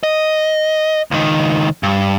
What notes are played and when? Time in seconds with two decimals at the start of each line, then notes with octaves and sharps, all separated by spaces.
0.03 D#5
1.11 C#2 D#3
1.83 G2